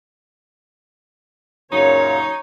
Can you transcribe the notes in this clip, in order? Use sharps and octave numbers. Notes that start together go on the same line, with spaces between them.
F#2 A#2 C#3 D#4 C#5